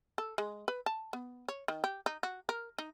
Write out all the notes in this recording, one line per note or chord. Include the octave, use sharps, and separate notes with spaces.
A4
G#3
B4
A5
B3
C#5
D#3
G4
D#4
F#4
A#4
D#4